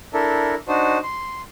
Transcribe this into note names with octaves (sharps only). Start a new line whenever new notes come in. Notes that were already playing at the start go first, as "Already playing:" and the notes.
D4 E4 A4 A#4
D4 D#4 F#4 C5
C6